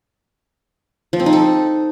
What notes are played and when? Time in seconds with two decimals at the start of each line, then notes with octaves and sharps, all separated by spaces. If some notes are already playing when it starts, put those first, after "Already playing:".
1.13 F3
1.20 C4
1.26 D#4
1.33 A4